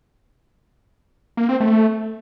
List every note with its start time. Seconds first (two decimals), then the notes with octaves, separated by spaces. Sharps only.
1.37 A#3
1.49 C4
1.60 A3